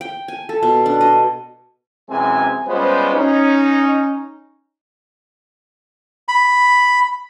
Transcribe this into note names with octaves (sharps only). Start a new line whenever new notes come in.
G5
G#5
A4
B2
D4
D#5
F#2 C3 E3 G#3 C4 G#5
G3 G#3 B3 C#4 F4 C5
C#4 D#4
B5